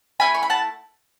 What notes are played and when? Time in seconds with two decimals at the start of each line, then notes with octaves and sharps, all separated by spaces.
0.20 A3 C#4 E4 G#5 B5
0.34 C#6
0.43 B5
0.50 F#5 A5